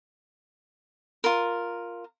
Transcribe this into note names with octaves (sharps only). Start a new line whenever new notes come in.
F4 A#4